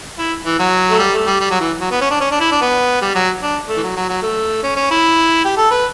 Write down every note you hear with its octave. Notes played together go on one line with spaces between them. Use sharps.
E4
E3
F#3
A3
G3
A3
G3
G3
F#3
E3
F#3
B3
C#4
D4
C#4
D4
E4
D4
B3
G3
F#3
D4
A3
E3
F#3
F#3
F#3
A3
C#4
C#4
E4
G4
A4
B4